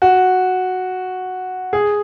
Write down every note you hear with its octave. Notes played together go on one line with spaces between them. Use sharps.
F#4
G#4